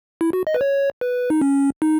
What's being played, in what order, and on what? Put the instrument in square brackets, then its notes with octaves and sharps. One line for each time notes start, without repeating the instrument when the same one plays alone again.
[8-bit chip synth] E4
F#4
D#5
B4
C#5
B4
D#4
C#4
D#4